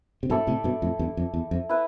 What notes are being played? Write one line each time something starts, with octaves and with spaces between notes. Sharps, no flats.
C3
G2 B2 E4 A4 D5
A2 C3
G2 B2
F2 A2
E2 G2
F2
E2
F2
E4 B4